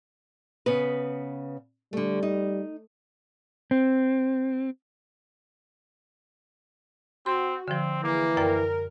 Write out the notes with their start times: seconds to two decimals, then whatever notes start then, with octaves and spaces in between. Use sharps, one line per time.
0.66 C#3 B3 B4
1.93 D3 G3 A3
2.23 D#4
3.71 C4
7.26 C4 F#4 C6
7.68 D3 F3 C4
8.03 E3 A#3 G#4
8.37 F#2 A#4 D5 G5